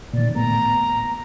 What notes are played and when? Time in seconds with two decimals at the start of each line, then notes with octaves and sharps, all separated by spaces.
0.13 A#2 D#3 D5
0.35 A2 A#3 B3 A#5